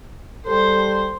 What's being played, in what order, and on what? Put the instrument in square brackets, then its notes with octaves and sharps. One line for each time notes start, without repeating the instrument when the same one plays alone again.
[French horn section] G3 G4 A4 [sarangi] C5